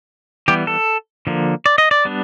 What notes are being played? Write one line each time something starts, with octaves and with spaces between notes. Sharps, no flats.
E3 G3 B3 G4
A4
D3 F3 A#3
D5
D#5
D5
G3 B3 D4